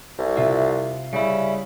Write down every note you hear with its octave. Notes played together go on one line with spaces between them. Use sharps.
C2
C3 F4 E5
C#3 G3 E4